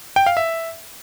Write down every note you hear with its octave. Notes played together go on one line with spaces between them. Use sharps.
G5
F5
E5